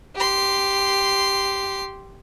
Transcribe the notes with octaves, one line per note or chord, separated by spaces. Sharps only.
G4 C6